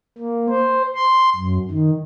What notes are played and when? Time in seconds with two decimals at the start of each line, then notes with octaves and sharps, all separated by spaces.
0.18 A#3
0.49 C5
0.95 C6
1.36 F#2
1.71 D#3